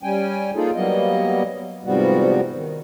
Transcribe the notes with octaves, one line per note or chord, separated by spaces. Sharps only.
G3 C#4 G5 G#5
A#3 D#4 F4 G#4 A4
F#3 G3 A#3 B3 D#5
G#2 C3 F3 G3 B3 F#4
D#3